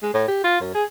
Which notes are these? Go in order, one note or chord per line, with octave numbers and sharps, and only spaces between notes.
G#3
A2
G4
F4
F#2
G#4